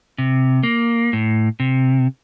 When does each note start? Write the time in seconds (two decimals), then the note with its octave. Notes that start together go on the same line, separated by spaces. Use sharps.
0.18 C3
0.63 A#3
1.13 A2
1.60 C3